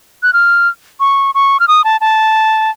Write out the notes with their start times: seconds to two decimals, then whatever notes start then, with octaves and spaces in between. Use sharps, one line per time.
0.23 F#6
0.33 F6
1.00 C#6
1.35 C#6
1.60 F6
1.68 D#6
1.84 A5
2.01 A5